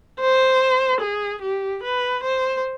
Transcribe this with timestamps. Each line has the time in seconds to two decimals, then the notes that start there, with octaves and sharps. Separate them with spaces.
0.20 C5
1.01 G#4
1.41 G4
1.83 B4
2.23 C5